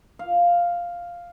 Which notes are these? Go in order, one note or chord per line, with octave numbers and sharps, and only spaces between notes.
F5